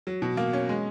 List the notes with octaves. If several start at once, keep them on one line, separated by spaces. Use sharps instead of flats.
F#3
B2
A#3
C#4
G#3